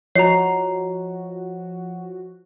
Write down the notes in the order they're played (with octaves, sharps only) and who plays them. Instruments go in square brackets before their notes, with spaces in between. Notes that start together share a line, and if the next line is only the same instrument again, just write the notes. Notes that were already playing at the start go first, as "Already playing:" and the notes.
[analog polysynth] F3 F#4 [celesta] C#5 D#5 [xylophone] A#5 C7